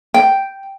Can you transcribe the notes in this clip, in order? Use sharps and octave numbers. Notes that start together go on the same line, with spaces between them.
G5